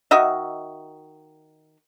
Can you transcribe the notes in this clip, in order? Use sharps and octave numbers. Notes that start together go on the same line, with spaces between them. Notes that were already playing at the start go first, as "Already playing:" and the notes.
D#3 F#4 D#5 E5